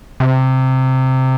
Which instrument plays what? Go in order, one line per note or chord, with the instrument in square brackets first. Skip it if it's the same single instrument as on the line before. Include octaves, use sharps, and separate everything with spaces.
[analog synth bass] C3